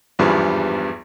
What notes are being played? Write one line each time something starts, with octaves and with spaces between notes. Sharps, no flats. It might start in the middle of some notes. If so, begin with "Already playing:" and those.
G#1 E2 G2 F3 G3 B3